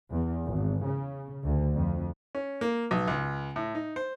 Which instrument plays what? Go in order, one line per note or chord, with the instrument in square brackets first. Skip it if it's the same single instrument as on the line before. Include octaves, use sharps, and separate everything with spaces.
[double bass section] E2
G#1
C#3
D2
F2
[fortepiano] C#4
A#3
B1
C#2
A2
D#4
C5